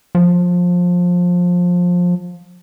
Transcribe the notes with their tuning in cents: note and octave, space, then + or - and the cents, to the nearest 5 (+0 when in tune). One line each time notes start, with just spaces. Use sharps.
F3 +20